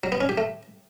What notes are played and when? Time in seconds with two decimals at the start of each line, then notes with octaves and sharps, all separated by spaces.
0.04 F#3
0.12 B3
0.21 C#4
0.29 G4
0.38 A3